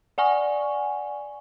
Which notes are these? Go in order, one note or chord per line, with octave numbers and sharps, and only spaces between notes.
D5 F#5 G#5 C#6